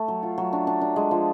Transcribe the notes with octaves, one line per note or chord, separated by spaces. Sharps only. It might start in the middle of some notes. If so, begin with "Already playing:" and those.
Already playing: A3
F#3
F4
F#3
D4
D4
D4
G#3
F3